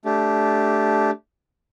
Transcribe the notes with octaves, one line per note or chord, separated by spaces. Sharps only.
A3 D4 G4